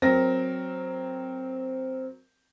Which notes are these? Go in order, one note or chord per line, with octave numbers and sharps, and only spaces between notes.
F#3 C4 A#4 A#6